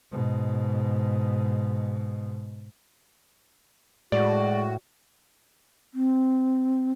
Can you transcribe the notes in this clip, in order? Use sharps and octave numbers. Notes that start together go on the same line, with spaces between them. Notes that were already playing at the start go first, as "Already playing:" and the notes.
G#2 B2
A2 G#3 F#4 D5
C4